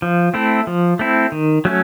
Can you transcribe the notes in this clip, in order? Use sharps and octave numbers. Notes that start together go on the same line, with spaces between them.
F3
A3 C4 E4
F3
A3 C4 E4
D#3
F#3 A3 C#4